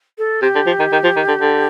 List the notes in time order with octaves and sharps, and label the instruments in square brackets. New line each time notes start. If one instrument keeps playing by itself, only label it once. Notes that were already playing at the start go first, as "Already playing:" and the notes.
[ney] A4
[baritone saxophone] C3 [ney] G4
[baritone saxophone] D3
F3
D#3
D#3
F3
D#3
D3
D3